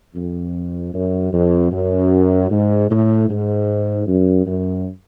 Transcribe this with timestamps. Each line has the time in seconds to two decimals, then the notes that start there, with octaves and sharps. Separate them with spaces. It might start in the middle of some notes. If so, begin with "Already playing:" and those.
0.15 F2
0.93 F#2
1.33 F2
1.72 F#2
2.50 G#2
2.89 A2
3.28 G#2
4.06 F#2
4.45 F#2